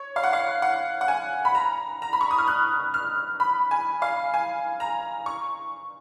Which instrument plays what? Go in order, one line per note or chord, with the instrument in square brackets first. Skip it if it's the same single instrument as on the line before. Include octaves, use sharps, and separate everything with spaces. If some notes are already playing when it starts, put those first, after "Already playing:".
Already playing: [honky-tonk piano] C#5
F5
F#5
F5
F#5
F#5
G#5
B5
A#5
A#5
B5
C#6
D#6
F6
F#6
F6
B5
G#5
F5
G#5
A#5
C#6